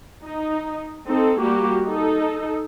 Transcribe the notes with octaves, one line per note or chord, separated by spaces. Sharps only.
D#4
C4 D#4 A4
G3 A#3 F#4 G4
D#4 A4